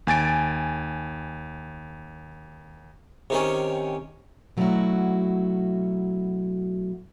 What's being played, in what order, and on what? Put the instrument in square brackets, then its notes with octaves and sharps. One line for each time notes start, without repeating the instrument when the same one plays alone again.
[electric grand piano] D#2 G#5 A6 D7
[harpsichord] C3 D#3 C#4
[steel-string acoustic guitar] B2 F#3 A3 C#4 E4 F#4